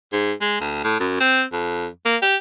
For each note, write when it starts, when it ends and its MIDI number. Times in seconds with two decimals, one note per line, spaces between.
0.12 0.32 44
0.41 0.59 56
0.60 0.79 38
0.84 0.96 45
1.00 1.16 42
1.20 1.43 60
1.52 1.87 41
2.05 2.17 58
2.22 2.36 67